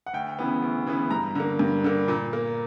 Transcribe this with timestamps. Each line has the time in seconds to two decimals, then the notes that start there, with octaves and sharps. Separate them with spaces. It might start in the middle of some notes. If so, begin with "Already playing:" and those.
0.06 F#5
0.13 D2 G5
0.39 C#3 E3 B3
0.62 D2
0.87 C#3 E3 B3
1.10 G2 A#5
1.35 D3 A#3
1.59 G2
1.84 D3 A#3
2.08 A#2
2.33 A#3